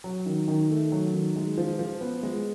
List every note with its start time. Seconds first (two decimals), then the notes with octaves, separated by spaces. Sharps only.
0.04 F#3
0.26 D#3
0.48 D#3
0.70 A3
0.92 F#3
1.13 D#3
1.36 G#3
1.58 F3
1.79 F3
2.01 B3
2.23 G#3